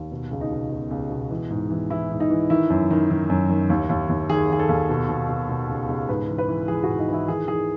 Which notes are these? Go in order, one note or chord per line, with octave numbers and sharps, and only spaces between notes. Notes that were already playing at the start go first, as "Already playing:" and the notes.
Already playing: D#2
B2
C#2
D#4
B2
B2
C#2
B2
E3
G#2
E3
E3 E4
G#2
D#4
E3
D#3 E4
F#2
D#3
D#3
F#2
D#3
D#2
D#2
D#2
D#3 G#4
D#3 G#4
A4
D#2
B2
B2
B2
B2
C#2
C#2
G#2 B4
E3
B4
E3
E3 G#4
G#2 F#4
D#4
E3 E4
D#3 G#4
D#3 G#4